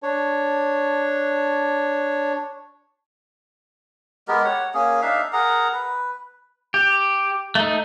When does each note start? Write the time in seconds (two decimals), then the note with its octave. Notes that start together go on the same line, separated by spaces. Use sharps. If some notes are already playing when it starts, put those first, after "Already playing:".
0.03 D4 C#5
4.28 G#3 B3 G4 A#4
4.44 C#5 F#5
4.74 A#3 C#4 G#4
5.02 D4 D#4 E5 F5
5.33 G#4 A#4 F#5 A#5
5.73 B4
6.74 G4
7.55 A3 D#4